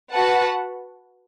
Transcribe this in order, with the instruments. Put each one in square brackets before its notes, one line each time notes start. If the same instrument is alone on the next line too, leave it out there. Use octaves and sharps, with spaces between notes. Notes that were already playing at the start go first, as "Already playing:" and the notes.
[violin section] F#4 B4 F#5 A5